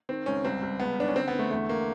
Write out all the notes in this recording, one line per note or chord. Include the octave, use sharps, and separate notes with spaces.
D#3 C4
C#2 C#4
C2 C4
C2
C#2 B3
D#3 D4
C#4
D3 C4
B3
D3 A3
E2 A3
A#3